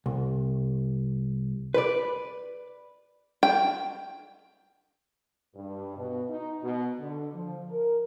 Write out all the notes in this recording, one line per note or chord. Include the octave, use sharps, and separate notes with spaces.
C2
B4 D5
G5
G2
B2
D#4
B2
D3
F3
A#4